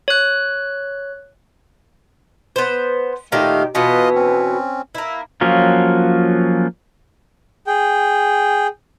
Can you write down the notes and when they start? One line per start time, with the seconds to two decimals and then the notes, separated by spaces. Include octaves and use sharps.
0.08 C#5 F#6
2.56 B3 C5
3.32 A#2 D#3 A3 G4 F5
3.75 B2 E3 B3 F4 D#5
4.15 C4 C#4
4.95 A#3 E4
5.41 F3 F#3 A#3 C#4 F4
7.67 G#4 G5